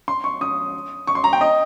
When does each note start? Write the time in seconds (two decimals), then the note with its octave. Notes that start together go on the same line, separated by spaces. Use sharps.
0.08 C6
0.24 C#6
0.41 D#6
1.07 C#6
1.15 C6
1.24 A#5
1.33 G5
1.41 D#5